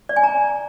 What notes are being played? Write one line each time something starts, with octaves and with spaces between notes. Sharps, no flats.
D5
G#5
A#5